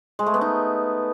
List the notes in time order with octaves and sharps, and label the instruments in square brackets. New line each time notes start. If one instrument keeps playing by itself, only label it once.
[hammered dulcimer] G#3
A3
B3
D#4